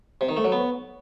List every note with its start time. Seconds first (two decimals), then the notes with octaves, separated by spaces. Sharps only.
0.21 C3
0.29 D#3
0.37 A3
0.44 F#3
0.52 B3